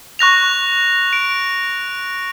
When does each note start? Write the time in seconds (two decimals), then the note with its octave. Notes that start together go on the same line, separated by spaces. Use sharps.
0.19 C#6 F#6 A#6 F7
1.13 D7